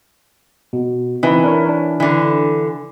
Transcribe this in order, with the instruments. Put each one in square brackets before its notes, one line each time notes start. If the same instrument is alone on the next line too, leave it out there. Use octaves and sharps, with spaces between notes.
[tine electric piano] B2
[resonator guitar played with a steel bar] E3 [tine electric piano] C4 D#4 B4
[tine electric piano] D4 A#4 C#5
D4
[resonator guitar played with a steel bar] D3 E3